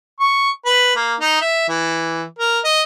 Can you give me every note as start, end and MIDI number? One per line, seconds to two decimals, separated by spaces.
0.20 0.50 85
0.66 0.91 71
0.96 1.14 58
1.20 1.40 63
1.41 1.68 76
1.68 2.23 52
2.39 2.59 70
2.64 2.81 75